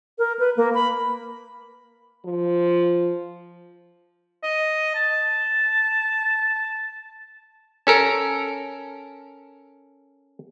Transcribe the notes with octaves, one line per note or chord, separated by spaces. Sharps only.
A#4
B4
A#3
B5
F3
D#5
A5
C#4 A4 A#4